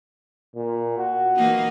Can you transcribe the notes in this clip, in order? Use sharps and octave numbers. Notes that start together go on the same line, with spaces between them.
A#2
F#4
E3 A#3 D#4